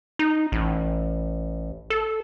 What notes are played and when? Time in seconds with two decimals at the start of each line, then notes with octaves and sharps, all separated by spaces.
0.19 D#4
0.52 A1
1.90 A4